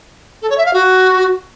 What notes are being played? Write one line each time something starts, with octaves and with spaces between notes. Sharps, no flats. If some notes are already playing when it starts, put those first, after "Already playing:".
A4
C#5
E5
F5
F#4